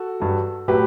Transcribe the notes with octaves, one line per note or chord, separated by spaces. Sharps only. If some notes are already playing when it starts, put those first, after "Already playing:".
Already playing: F#4 A4
G2 F#3
A2 F#3 G4 B4